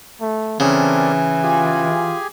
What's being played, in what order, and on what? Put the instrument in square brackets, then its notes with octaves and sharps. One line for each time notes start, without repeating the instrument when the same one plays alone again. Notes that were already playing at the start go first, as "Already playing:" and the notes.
[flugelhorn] A3
[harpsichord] C#3 [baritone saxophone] E3 [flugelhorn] C4 [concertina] D4 A4 A#4
[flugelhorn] F4 [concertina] G4 G#4 G#5